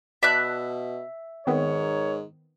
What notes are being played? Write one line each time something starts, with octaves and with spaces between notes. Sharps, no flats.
B2 D5 E5 A5 B5 F#6
G#2 D#3 B3 C4 A#4 C#5